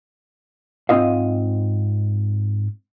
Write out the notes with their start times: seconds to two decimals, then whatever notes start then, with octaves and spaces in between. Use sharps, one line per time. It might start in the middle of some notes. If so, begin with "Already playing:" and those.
0.89 G#2 C4 F4 D#5 F5